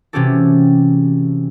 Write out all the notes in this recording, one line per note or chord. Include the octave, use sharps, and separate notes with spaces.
C3 E3 C#4 F#4 G4 A4